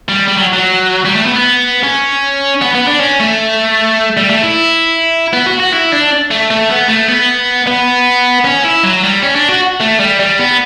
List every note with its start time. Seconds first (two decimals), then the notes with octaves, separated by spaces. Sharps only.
0.09 G3
0.28 G3
0.37 F#3
0.54 F#3
1.05 G3
1.15 A3
1.25 B3
1.35 B3
1.83 C#4
2.62 B3
2.75 B3
2.87 D4
3.00 C#4
3.20 A3
4.17 G3
4.30 A3
4.43 E4
5.33 B3
5.46 F#4
5.60 F#4
5.73 E4
5.92 D4
6.31 A3
6.50 A3
6.70 B3
6.88 A3
7.08 B3
7.67 B3
8.44 C#4
8.64 E4
8.83 F#3
9.03 G3
9.23 C#4
9.35 D4
9.49 F#4
9.81 A3
10.00 G3
10.20 G3
10.39 B3